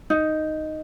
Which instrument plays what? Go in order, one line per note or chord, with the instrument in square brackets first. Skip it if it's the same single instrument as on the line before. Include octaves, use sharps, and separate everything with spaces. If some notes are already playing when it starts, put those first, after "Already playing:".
[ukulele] D#4